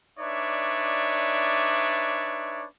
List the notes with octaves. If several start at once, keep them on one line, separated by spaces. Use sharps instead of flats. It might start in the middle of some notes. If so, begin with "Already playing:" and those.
D4 D#4 B4 C#5 D5 E5